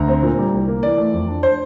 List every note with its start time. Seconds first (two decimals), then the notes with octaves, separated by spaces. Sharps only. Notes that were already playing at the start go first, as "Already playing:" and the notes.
Already playing: D2 A#5
0.08 C4
0.23 A#2
0.38 G3
0.53 C2
0.68 A#3
0.83 E3 D5
0.98 A3
1.13 F2
1.28 D4
1.43 C5